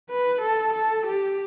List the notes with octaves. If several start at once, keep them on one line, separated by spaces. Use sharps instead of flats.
B4
A4
A4
G4